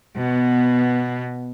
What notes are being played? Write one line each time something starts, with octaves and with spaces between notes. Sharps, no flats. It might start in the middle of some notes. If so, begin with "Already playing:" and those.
B2 B3